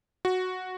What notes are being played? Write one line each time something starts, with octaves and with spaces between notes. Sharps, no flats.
F#4